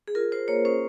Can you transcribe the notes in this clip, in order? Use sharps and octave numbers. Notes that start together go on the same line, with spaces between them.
G#4
F4 A#4
F4 C5
A#3 C#5
C#4 C5